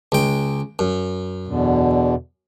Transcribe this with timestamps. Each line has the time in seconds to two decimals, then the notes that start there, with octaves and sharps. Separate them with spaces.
0.12 C#2 G5
0.79 F#2
1.47 E2 B2 D3